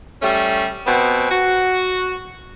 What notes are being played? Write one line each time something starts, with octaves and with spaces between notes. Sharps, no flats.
G3 A3 C#4
B2 B3 C4
F#4